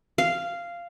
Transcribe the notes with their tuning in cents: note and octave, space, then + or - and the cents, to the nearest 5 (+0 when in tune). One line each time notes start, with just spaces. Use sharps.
F5 -10